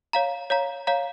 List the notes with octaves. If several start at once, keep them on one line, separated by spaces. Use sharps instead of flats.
C#5 F5 A#5
C#5 F5 A#5
C#5 F5 A#5